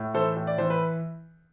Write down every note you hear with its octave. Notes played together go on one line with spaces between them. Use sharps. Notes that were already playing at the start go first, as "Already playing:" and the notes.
Already playing: A2
E3 A4 C5
A2
D5
E3 C5
B4